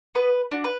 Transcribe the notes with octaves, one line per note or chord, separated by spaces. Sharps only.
B3 B4
D4 F#4
B4